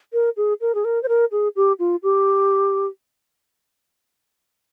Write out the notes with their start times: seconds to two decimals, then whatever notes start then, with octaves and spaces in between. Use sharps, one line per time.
0.13 A#4
0.37 G#4
0.61 A#4
0.75 G#4
0.84 A#4
1.03 C5
1.08 A#4
1.32 G#4
1.56 G4
1.79 F4
2.03 G4